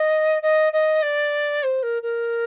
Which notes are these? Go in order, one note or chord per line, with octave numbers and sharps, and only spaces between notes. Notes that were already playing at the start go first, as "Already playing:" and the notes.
Already playing: D#5
D#5
D#5
D5
C5
A#4
A#4